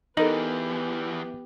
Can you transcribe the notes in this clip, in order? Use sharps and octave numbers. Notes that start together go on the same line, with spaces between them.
E2 E3 B3 D#4 G4 A4 A#4 F#7